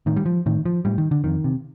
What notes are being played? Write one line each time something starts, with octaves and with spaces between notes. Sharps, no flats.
A2 D#3
G3
F3
A2 D#3
F3
A2 G3
D#3
D3
F2 D#3
C3